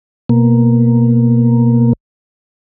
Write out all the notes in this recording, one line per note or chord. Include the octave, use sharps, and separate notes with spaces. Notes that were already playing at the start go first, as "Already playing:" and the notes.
B2 A#3